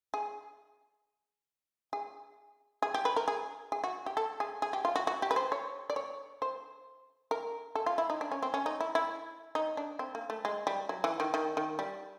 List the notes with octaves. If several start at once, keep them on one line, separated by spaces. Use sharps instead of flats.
G#4
G#4
G#4
G4
B4
A#4
G#4
G#4
F#4
G4
A4
G#4
G#4
G4
F4
F#4
F#4
G4
B4
C5
C#5
D5
C#5
C5
A#4
A4
F4
E4
D#4
D4
C#4
C4
C#4
D#4
E4
E4
D#4
D4
C4
A#3
A3
G#3
G3
F#3
E3
D#3
D#3
D#3
G3